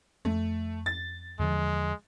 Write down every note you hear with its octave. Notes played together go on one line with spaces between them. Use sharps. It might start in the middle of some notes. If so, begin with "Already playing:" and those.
F2 A3
A6
E2 D3 F3 G#3